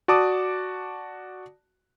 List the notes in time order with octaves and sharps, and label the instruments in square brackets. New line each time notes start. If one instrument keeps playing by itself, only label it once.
[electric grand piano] F#4 D5 A5 D6 D#6